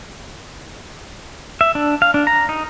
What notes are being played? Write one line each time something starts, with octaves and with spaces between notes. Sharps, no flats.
E5
D4
F5
D4
A#5
D#4